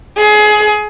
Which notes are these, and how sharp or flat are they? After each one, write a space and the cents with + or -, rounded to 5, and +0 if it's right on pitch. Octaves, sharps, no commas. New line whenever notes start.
G#4 +25